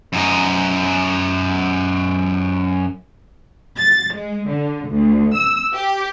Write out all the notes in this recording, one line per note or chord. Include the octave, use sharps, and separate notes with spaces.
F#2 D#4
A6
G#3
D3
D2
E6
G4